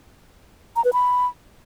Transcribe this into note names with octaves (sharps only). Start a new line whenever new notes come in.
A#5
B4
B5